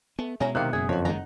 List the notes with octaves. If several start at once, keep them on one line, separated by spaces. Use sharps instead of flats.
A3 B3
B2 G#3 C#4 E4 C#5 A#5
C3 D#3 E4 G4 F5 F#6 C#7
F#1 G#4 E5 F#5
F2 F#4 C#5
D#3 G#3 D#4 F#5 A#5